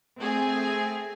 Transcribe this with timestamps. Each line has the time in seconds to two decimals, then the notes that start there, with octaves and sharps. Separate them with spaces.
0.18 A3 C4 G#4